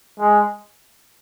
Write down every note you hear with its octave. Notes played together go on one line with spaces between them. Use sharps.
G#3